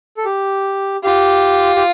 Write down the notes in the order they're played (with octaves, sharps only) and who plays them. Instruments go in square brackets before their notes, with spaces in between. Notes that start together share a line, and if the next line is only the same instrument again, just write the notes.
[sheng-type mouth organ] A4
G4
[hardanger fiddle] F4 [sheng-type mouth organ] G4
[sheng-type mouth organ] G4